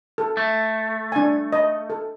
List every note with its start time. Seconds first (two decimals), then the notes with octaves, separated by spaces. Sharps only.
0.18 A4
0.37 A3
1.12 D4 G#5
1.53 D#5
1.90 A4